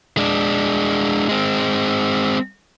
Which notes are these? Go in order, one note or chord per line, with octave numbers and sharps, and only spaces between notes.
G#3 D4
G#3 C4